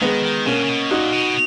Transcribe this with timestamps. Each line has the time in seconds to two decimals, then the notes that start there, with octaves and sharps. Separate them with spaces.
0.01 D#3 G#3 B3
0.24 D#3
0.46 B2 A#3 C#4
0.63 C#3
0.69 B2
0.90 A#2 D#4 F#4
1.13 B2